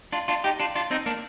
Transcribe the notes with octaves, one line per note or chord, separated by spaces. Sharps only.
D4 F4
D4 F4
D#4 G4
D4 F4
D4 F4
C4 D#4
A#3 D4